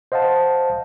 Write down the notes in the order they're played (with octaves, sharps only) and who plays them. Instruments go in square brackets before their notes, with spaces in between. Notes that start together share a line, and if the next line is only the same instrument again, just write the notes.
[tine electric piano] C5 D#5 F5 F#5 A5